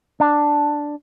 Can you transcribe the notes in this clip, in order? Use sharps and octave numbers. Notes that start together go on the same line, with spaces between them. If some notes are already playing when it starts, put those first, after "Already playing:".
D4